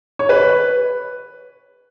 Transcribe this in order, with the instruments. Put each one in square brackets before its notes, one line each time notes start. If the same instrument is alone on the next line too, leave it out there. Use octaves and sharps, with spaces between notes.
[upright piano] C#5
B4